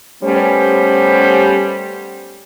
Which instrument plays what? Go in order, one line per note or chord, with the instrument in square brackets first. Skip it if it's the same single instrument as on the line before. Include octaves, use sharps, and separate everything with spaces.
[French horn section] G3 A3 B3 C#4 G4 C5